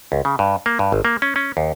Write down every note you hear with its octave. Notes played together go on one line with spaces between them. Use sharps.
C#2
C#3
G2
A#3
G2
G#1
A#3
C#4
C#4
D#2